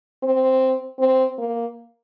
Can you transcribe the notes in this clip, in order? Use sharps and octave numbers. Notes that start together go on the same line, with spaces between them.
C4
C4
A#3